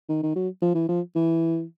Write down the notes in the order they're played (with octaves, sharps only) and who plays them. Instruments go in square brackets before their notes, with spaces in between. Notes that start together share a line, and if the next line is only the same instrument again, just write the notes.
[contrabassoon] D#3
D#3
F#3
F3
E3
F3
E3